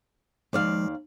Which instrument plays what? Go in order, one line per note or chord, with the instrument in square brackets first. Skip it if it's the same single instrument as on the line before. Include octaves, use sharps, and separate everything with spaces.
[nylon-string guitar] D#2 D5 F5 [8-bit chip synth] F3 G#3